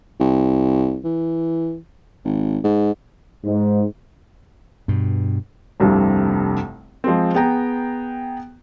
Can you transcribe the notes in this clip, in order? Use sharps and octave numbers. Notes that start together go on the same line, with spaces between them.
C2
E3
G#1
G#2
G#2
G2 B2
F1 C2 G2 C3
F3 G#3 C4
B3 G#4 G5 A#5